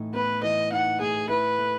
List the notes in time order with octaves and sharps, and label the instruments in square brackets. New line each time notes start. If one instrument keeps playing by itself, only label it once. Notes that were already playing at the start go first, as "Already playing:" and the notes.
Already playing: [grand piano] A2 E3 D#4
[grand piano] B3 [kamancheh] B4
[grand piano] E3 [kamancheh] D#5
[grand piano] D#4 [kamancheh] F#5
[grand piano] A2 [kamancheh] G#4
[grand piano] E4 [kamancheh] B4
[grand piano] A3